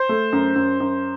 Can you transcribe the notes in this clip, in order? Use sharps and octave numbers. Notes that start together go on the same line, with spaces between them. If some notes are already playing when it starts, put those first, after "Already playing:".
Already playing: C5
A3
F#2
F#2
F#2